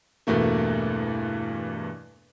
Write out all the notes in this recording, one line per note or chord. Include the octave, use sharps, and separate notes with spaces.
E2 G2 B2 A3 A#3